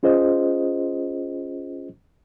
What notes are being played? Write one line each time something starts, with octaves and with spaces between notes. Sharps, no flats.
C#4 F4 G#4 C5 D#5